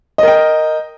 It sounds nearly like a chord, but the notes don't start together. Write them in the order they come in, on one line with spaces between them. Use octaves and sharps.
D#5 A#4 G5